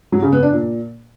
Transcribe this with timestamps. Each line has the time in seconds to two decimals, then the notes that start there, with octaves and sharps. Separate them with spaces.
0.12 F#3
0.22 C#3
0.33 B3
0.43 D4
0.53 A#2